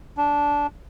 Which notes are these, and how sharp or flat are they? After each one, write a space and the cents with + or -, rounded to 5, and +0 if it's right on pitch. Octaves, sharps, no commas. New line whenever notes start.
D4 -15